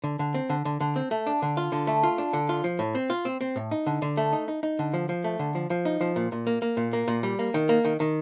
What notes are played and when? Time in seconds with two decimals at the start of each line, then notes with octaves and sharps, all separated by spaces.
0.04 D3
0.19 D3
0.34 C4
0.50 D3
0.65 D3
0.80 D3
0.96 C4
1.11 A3
1.27 D4
1.42 D3
1.57 F4
1.72 D3
1.87 A3
2.03 F4
2.18 D4
2.33 D3
2.49 F4
2.64 F3
2.79 A2
2.95 C4
3.10 F4
3.25 C4
3.41 C4
3.56 A2
3.71 D#4
3.86 D3
4.02 D3
4.17 A3
4.33 D#4
4.48 D#4
4.63 D#4
4.79 D3
4.94 F3
5.09 F3
5.24 A3
5.39 D3
5.55 F3
5.70 F3
5.85 D#4
6.01 F3
6.16 A#2
6.32 A#2
6.47 A#3
6.62 A#3
6.77 A#2
6.93 A#3
7.08 A#2
7.23 G3
7.39 A#3
7.54 D#3
7.69 A#3
7.85 D#3
8.00 D#3